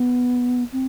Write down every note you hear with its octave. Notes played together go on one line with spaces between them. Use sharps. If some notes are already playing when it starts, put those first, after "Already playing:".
Already playing: B3
C4